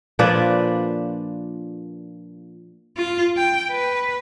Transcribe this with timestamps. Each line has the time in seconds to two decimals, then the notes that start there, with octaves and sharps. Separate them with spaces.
0.19 A#2 F3 D4 B4
2.97 F4
3.37 G5
3.72 B4